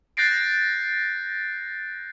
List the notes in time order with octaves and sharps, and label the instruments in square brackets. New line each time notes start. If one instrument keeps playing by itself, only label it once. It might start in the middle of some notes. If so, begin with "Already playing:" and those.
[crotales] F#6 G6 A6 A#6 C7 D7